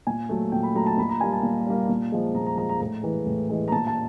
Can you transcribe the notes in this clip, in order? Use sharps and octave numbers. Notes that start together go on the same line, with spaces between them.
A#2 G#5
F#3 A3
A#2 G5
B5
F#3 A3 A#5
A5
A#2 B5
A#5
G3 A#3 G#5
A5
A#2
G3 A#3
A#2
F3 G#3
A#2 A#5
A#5
F3 G#3 A#5
A#5
A2 A#5
E3 G#3
A2
E3 G#3
A#5
A#2 A5
A5